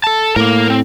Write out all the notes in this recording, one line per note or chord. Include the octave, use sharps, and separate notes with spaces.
A4 A5
A2 A#3 A#4
C4